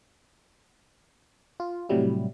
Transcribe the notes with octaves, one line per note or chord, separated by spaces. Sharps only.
F4
A2 C3 F#3 G3 E4